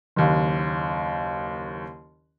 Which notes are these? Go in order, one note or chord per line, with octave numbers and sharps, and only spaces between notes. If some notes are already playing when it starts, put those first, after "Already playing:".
F#1 D#2